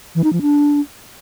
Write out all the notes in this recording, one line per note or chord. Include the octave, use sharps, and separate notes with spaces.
E3
D#4
F3
D4